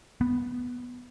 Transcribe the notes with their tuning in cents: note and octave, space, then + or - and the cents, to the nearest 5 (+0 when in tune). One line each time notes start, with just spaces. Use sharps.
B3 +0